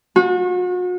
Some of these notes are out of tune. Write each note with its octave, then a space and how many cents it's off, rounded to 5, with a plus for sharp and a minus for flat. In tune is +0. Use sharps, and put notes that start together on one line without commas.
F#4 -40